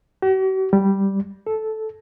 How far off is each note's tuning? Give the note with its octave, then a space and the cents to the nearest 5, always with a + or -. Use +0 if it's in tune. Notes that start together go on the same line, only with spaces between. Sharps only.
F#4 +45
G3 -5
A4 -10